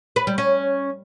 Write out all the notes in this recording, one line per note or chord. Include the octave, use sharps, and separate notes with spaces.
B4
G3
C#4